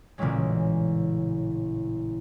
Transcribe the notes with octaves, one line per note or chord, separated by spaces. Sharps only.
A1 A#2 C#3 E3 F#3 G#3